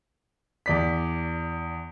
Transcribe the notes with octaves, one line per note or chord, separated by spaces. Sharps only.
E2 D5 B6